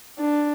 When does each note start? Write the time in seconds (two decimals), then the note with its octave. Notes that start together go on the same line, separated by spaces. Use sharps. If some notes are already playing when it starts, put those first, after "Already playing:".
0.19 D4